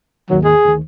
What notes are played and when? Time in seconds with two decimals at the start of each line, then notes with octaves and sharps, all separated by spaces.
0.30 G#1 D#2 D#3 F#3
0.44 G#4
0.65 D2 D#3